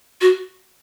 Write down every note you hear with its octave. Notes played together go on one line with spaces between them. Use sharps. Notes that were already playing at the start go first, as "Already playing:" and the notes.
F#4